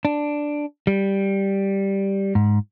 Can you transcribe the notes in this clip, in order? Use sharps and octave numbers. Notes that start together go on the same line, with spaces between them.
D4
G3
G#2